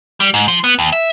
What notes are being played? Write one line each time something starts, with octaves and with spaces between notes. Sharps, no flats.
G3
G#2
F3
B3
D#2
E5